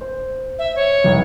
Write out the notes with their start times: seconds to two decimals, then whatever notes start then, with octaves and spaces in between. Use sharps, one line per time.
0.01 C5
0.59 E5
0.76 C#5
1.04 F1 C2